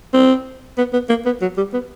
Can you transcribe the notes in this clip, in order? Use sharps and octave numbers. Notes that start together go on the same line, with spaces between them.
C4
B3
B3
A#3
B3
F#3
G3
B3